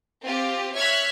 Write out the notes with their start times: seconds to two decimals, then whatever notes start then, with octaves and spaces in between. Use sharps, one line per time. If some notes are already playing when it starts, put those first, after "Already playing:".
0.24 C4 F4 G4
0.74 C#5 E5 F6 F#6 G#6 B6